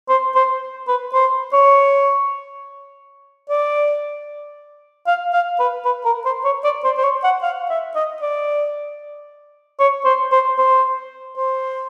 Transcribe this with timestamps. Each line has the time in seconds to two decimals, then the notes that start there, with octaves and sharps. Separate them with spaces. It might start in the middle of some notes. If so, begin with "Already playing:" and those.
0.09 C5
0.35 C5
0.88 B4
1.14 C5
1.53 C#5
3.49 D5
5.07 F5
5.33 F5
5.60 B4
5.85 B4
6.05 A#4
6.25 C5
6.45 C#5
6.64 D5
6.84 C5
6.97 C5
7.04 C#5
7.24 F#5
7.43 F5
7.70 E5
7.96 D#5
8.22 D5
9.80 C#5
10.05 C5
10.32 C5
10.58 C5
11.37 C5